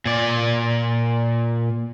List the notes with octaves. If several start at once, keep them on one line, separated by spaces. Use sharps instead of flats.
A#2 D5